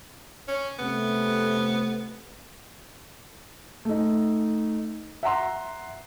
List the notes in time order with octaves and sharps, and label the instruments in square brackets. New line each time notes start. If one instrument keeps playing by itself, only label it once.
[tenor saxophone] C#4
[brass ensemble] C3 A3 [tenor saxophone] B3
[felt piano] A3 D#4
E5 F#5 A#5 C6